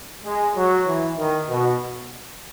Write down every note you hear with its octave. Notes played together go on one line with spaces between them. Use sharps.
G#3
F#3
E3
D#3
B2